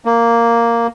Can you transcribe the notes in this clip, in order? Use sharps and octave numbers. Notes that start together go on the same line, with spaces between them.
A#3